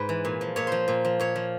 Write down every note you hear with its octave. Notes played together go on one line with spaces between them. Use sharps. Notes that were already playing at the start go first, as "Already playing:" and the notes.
Already playing: G#2 B4
E3
A#2
F3
A#2 C#5
F3 C5
A#2
F3
A#2 C#5
F3